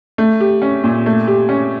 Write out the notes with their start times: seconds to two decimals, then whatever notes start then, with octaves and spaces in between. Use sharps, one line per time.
0.18 A3
0.40 G4
0.62 C#4
0.84 A#2
1.06 A3
1.27 G4
1.49 C#4